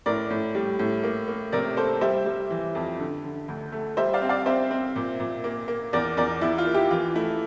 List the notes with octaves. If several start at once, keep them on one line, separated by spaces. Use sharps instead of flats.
A2 A#4 D5
A2
G3
A2
A#3
A#3
C3 A#4 D5
A#3 A4 C5
G3 C5 E5
G3
E3
F2
D3
D3
D2
A3
G3 C5 E5
D5 F5
C4
D5 F5
C4 C5 E5
C4
A#2
A#2
A#3
A#3
E2 A#4 D5
E2 A#4 D5
E2 E4
F4
A#3
E4 G4
E3 F4
A3 E4